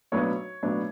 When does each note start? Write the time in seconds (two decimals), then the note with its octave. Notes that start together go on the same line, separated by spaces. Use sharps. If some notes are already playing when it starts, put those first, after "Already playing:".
0.12 B1 A2 F#3 B3 D4 C#5
0.63 B1 A2 F#3 B3 D4